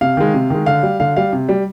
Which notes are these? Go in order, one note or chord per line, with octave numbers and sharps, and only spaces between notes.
C3 F5
D#3 G#3
C3
D#3 G#3
D3 F5
G3
D3 F5
G3 F5
C3
G3